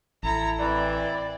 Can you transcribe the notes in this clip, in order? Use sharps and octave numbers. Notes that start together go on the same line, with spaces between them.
A1 E4 A4 A#5
E3 C4 E4 D5